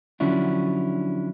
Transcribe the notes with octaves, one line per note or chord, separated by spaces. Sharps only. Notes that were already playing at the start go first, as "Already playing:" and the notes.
D3 F3 F#3 C#4 D4 E4